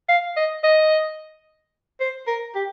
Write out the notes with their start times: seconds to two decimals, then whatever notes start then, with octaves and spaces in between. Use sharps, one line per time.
0.09 F5
0.37 D#5
0.64 D#5
2.01 C5
2.27 A#4
2.55 G4